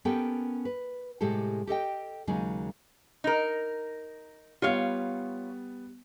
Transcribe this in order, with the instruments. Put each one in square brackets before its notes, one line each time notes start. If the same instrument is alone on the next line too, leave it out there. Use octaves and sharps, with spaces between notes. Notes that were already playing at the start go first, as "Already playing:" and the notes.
[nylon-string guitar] B3 C#4 G4 A4 A#4 G5
B4
A2 C3 G#3 G4 A4
G4 A4 D#5 G5
D#2 C#3 F#3 G#3 D#4 G#5
[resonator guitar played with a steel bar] D#4 A#4
[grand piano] G3 B3 [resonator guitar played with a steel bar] F4 C#5 F5